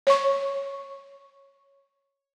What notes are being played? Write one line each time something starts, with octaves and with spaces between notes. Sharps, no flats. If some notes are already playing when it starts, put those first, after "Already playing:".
C#5 C#6